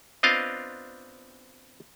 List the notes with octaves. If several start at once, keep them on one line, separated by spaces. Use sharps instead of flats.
B3 C4 D4 F4 D#5 F5